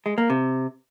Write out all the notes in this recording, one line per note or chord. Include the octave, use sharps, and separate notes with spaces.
G#3
A#3
C3